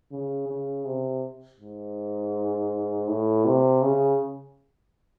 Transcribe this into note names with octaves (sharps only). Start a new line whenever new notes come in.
C#3
C#3
C3
G#2
A2
C3
C#3